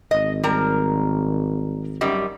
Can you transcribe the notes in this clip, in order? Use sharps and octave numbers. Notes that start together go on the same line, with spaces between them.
G#1 D#5
G3 A#4 A#5
F#2 D#3 G3